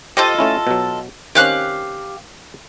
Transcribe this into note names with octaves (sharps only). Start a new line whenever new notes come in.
F4 G4 A4 C5 D#5
A3 C#4 E4
B2 F#3
D#3 C4 C#4 G4 F5 F#6